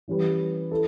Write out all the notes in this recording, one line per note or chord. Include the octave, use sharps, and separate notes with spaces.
E3 G3 C#4 G4 B4
E4 A4